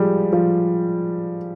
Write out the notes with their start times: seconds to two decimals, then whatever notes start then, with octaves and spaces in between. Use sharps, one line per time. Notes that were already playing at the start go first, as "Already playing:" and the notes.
Already playing: F3 G3 G#3
0.33 F3